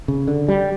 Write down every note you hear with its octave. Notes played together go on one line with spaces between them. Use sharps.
C#3
D3
G3